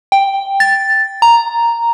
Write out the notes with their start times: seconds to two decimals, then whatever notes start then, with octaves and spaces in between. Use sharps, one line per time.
0.12 G5
0.60 A6
1.22 A#5